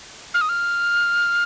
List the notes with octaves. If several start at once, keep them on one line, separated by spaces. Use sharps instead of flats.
F6
D#6
F6